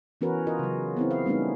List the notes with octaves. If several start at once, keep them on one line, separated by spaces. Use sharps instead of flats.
E3 B3 C#4 F#4 A#4 B4
F4 A#4 D#5
C#3 F#3
B3 C4 E4
F5
G3 A3 B3 C#4 D#4